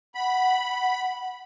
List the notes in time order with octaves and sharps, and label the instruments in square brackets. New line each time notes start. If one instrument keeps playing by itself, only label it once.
[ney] F#5 [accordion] B5